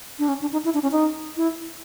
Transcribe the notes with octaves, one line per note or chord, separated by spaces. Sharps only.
D4
C#4
D4
D#4
E4
D4
C#4
D#4
E4